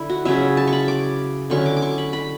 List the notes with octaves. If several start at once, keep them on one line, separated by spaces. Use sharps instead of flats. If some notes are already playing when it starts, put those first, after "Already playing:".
Already playing: D3 E4
F#4
C#3 F#3 C#4 E4 E5
A5
C#6
B5
D6
D3 F#3 C#4 E4 C#6
D6
D6
C#6
B5
B5